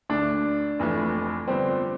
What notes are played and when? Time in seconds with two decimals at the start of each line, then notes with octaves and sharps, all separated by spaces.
0.09 D2 D3 A3 D4
0.79 F1 F2 E3 A3
1.48 G2 D3 F3 B3 C4